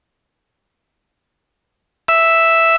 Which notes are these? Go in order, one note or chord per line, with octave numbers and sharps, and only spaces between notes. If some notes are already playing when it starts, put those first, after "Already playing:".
E5